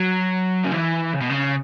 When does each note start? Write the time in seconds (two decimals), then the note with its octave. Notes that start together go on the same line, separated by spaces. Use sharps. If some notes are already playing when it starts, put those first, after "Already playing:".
Already playing: F#3
0.65 C#3
0.72 E3
1.14 C#3
1.21 B2
1.30 C#3